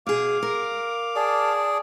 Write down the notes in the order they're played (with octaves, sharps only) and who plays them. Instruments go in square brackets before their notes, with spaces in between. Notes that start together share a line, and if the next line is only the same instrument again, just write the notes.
[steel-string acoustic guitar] B2 G#4 [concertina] F5 D6
[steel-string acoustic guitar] A#4
[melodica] G#4 D5 [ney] A5